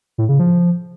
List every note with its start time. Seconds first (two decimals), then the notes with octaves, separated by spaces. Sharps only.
0.18 A2
0.29 C#3
0.39 F3